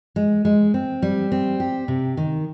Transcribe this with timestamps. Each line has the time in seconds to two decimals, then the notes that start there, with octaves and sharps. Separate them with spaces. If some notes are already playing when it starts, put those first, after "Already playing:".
0.16 G#3
0.45 G#3
0.74 C4
1.02 G3
1.32 C4
1.60 G4
1.88 C3
2.17 D#3